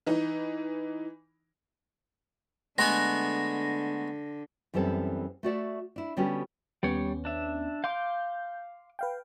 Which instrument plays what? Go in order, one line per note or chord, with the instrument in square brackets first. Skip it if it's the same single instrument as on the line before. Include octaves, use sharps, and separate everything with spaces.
[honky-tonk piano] E3 D#4
[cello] D3 [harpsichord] G#3 A3 G#5 [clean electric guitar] B3 [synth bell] A#6
[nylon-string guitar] F#2 E3 G3 B3 C4 A4
A3 F#4 D5 E5
D4 E4
D3 G3 B3 C#4 F#4 G4
[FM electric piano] D#2 B3 C#4 [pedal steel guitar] G3 C#5
[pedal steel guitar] D4 E5
[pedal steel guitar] F5 C6 D6 [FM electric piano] G6
[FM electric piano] B4 F5 G5